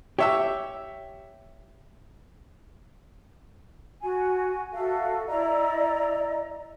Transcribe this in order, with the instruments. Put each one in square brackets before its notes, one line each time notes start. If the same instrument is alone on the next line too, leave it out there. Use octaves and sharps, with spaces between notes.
[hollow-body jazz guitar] G4 [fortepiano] C#5 E5 E6
[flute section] F#4 G#5
F#4 A4 E5 F5
E4 D5 D#5 A#5